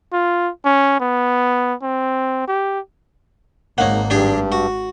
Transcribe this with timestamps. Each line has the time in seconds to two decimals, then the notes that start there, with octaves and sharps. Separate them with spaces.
0.13 F4
0.65 C#4
1.00 B3
1.83 C4
2.48 G4
3.78 G#1 A#3 D#4 C#5 F5 F#5
4.10 G2 D4 G4 G#4
4.52 F#4